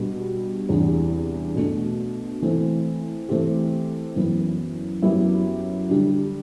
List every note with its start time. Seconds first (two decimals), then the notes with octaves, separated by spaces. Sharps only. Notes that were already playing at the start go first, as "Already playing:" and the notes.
Already playing: B2 G3 B3 D4 F#4
0.69 E2 C3 E3 G3 D4
1.56 B2 A3 D4
2.42 E3 A3 C4
3.29 E3 A3 C4 G4
4.16 F#2 E3 B3
5.02 F#2 F#3 B3 E4 G4
5.89 D3 G3 D4